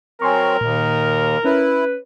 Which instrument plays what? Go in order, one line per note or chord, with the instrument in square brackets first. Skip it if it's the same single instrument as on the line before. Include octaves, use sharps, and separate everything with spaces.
[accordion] F#3 C4 [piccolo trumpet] A#4 [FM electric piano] G#5 C6 C#6
[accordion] D#2 [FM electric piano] A#2
[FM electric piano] C#4 [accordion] E4 [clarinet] B4